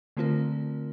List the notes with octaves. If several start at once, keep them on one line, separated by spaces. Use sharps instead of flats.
D3 A3 C4 F4 A#4